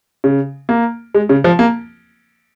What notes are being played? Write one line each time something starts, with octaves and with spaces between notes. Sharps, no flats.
C#3
A#3
G#3
C#3
F3
A#3